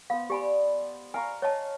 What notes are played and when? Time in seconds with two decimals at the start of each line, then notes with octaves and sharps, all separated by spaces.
0.10 B3 C5 F5
0.30 G4 D5 G#5 B5
1.14 F5 G#5 A#5 C#6
1.42 C#5 D#5 A5